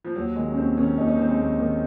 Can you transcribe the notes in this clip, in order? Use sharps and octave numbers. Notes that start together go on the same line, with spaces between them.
F3
D#2 F#3
D#3 G#3
C#4
D#2 C4
D#3 C#4
D#2 D#4
D#4
D#3 C4
G#3
D#2
D#3